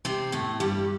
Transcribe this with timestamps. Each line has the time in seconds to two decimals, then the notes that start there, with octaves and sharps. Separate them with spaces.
0.05 C3 C4
0.32 A2 A3
0.60 G2 G3